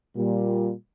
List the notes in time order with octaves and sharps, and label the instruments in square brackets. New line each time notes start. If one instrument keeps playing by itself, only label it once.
[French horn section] A#2 G3